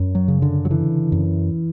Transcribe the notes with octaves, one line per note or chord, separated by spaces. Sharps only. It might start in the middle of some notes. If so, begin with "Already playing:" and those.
Already playing: F#2
F#3
C#3
D3
F#3
D3 E3
F#2